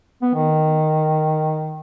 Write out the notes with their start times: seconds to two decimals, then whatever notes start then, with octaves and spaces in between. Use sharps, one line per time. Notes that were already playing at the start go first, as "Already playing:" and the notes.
0.22 B3
0.34 D#3